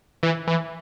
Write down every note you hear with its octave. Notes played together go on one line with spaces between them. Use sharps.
E3
E3